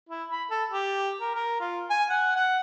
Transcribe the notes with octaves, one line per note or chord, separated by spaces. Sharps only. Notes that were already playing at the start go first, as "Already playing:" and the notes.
E4
B5
A4
G4
A#4
A#4
F4
G#5
F#5
F#5